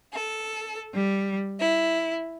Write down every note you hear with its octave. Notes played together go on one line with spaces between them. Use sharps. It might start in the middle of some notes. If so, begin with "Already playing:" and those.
A4
G3
E4